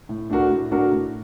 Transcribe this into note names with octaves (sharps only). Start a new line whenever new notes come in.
A2
A3 D4 F#4 A#4
A2
A3 D4 F#4 A#4
A2